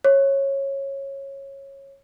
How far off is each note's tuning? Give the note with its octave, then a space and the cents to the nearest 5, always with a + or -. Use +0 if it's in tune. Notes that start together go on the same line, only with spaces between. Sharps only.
C#5 -15